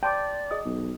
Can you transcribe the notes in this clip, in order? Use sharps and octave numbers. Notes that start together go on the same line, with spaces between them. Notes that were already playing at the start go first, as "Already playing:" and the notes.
D5 G5 A5 C6 D6
G#4 D#5 D#6
B1